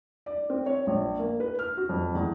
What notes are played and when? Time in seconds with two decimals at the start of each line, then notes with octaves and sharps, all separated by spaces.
0.26 D5
0.50 C4
0.66 C#5
0.87 A#1
1.19 A#3
1.40 B4
1.59 F6
1.77 F#4
1.89 F2
2.15 E2